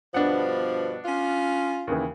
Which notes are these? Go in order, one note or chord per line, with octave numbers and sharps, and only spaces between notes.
G2 B2 F3 B3 D4 F#5
C#4 F4
D#2 C#3 E3